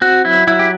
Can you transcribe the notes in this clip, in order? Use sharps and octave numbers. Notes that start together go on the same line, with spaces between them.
C4 F#4
F#3 E4
F#3 E4
G4